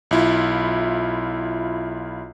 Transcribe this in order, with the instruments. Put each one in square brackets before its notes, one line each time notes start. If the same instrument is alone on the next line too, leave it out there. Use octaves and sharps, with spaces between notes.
[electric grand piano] B1 E4 F4